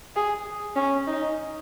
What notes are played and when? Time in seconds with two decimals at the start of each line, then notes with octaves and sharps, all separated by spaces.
0.16 G#4
0.76 C#4
1.07 D#4